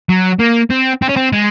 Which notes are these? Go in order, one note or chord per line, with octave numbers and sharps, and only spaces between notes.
F#3
A#3
C4
C4
C#4
C4
G#3